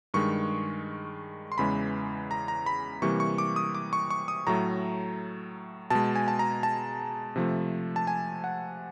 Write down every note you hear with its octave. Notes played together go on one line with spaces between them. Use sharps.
G2 D#3 G#3 C#6
C6
E2 C#3 E3 G#3 B5
A#5
A#5
B5
C3 E3 G3 A#3 C#6
C#6
D6
D#6
D6
C#6
C#6
D#6
A2 F#3 A3 A#5
B2 G#3 A5
G#5
A5
A#5
A5
C3 F3 A3
A5
G#5
F#5